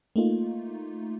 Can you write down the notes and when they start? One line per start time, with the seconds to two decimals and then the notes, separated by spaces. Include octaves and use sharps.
0.16 A3 A#3 D#4 F4